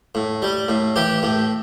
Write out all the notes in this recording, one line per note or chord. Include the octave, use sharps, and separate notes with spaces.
A2
G3
A2
E3 G4
A2